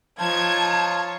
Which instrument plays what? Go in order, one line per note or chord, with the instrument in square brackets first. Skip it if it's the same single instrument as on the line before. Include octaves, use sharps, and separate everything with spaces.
[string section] F3 G#6 [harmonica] D#4 F4 C#5 [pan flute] A5